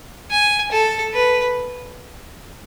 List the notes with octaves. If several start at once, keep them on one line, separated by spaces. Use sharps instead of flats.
G#5
A4
B4